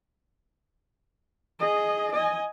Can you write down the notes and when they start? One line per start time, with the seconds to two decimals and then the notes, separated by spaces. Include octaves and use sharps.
1.59 G#4 D#5
2.13 D#5 G#5